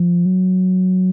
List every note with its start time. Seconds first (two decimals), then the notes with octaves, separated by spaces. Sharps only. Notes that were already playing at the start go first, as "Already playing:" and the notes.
Already playing: F3
0.26 F#3